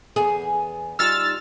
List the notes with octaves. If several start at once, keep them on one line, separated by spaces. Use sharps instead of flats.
E2 B3 G#4 G#5
G3 D#4 F4 E6 F6 A6